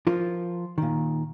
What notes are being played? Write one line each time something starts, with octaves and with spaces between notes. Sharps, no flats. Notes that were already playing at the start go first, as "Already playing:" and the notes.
F3 F4 A#4
A#2 D#3